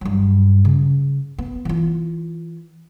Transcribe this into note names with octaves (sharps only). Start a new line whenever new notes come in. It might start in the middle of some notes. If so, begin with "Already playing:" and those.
G2 F#3
C#3
B3
E3 F4